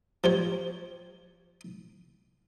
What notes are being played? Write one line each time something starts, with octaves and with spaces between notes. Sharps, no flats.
F3 G4 C#5